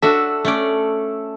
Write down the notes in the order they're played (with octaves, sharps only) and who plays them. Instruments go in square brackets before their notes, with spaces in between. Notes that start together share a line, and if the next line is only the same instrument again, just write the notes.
[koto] D4 F#4 E5 [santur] A4 E6
[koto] A3 C#4 D5